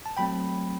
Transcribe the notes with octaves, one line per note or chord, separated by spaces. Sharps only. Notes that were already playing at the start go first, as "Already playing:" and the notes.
A5
F#3 A3 C4 G5 B5